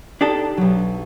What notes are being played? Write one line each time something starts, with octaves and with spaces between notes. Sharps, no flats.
D4 D#4 G4 A4 D#6 A6
B1 F#3